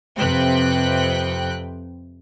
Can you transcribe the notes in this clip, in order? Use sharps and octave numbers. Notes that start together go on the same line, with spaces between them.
F2 C3 B4 G5 F#6